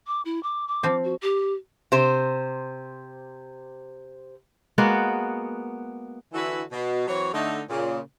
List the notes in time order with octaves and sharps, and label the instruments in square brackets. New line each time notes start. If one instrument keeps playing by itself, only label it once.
[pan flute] D6
E4
D6
D6
[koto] F3 C4
[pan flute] F#4
G4
[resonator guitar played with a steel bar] C3 C5
[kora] G#3 A#3 B3 F#4
[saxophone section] D3 E3 E4 F#4 A4 B4
B2
E3 F#3 C4 C#5
D3 A3 D#4
A#2 C#3